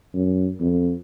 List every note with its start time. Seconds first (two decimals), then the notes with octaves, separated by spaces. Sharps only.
0.15 F#2
0.60 F2